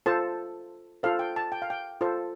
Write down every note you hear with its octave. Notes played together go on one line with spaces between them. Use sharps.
F4 A4 C5 A5
F4 A4 C5 F5
G5
A5
G5
F5
G5
F4 A4 C5